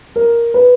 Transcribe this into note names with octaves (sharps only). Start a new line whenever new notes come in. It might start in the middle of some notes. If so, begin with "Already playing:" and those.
A#4
B4